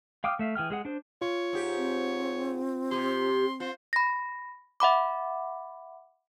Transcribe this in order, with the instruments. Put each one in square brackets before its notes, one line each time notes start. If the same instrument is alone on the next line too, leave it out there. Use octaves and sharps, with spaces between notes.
[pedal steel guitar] F5 G5 D6 D#6 F6
A3 E5 F5
E3 G#4 G5 F6
G#3 G#4 F#5
D4 C5
[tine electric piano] F4 [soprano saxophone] C#5
[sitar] G#2 G4
[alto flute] C4
[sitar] C3 G4 [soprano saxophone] C6
[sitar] F4 [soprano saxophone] C5
[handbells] B5 A#6
E5 F#5 B5 D6